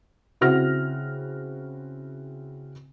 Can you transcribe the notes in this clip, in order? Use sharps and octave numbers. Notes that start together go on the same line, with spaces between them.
C#3 C4 E4 F#4 F6 A#6